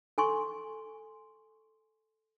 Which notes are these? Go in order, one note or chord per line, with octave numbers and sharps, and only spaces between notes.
A4 G#5 C6 C#6